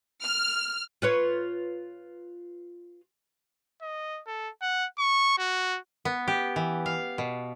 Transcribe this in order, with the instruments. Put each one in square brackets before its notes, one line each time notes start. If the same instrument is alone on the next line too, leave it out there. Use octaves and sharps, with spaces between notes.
[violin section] F6
[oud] F4 B4 C#5
[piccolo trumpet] D#5
A4
F#5
C#6
F#4
[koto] B3
G4
E3
F5
B2